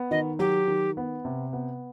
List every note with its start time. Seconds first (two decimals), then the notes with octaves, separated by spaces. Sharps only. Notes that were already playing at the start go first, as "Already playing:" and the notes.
Already playing: B3
0.11 D#3 D#5
0.39 F#3 G4
0.67 D#3
0.97 B3
1.25 C3
1.53 B3